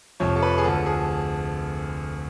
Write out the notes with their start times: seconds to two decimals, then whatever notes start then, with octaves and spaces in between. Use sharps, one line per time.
0.20 F1 F2 F3 C#5
0.36 A4
0.42 B4
0.58 G#4
0.64 D2 D3 F3 A4
0.86 G#4